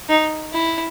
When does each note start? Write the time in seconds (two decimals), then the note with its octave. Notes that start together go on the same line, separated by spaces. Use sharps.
0.09 D#4
0.53 E4